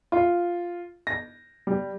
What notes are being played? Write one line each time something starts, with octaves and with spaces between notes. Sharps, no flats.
F4
A#6
G3